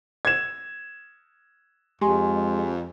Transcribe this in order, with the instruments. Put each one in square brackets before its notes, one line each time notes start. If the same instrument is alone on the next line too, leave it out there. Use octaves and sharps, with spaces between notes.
[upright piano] G#6 E7
[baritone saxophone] F2 [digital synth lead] G#3 [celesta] G4 G#5 C6